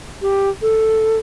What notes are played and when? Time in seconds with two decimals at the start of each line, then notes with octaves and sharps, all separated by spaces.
0.22 G4
0.62 A4